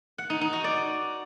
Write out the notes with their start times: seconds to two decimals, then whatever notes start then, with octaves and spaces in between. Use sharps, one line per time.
0.18 F#5
0.30 D#4
0.41 D#4
0.53 F#4
0.64 D5